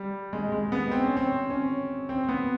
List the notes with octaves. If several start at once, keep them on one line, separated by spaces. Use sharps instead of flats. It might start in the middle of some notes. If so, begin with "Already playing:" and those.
Already playing: G3
G#3
G#3
B3
C4
C#4
C4
C#4
C4
B3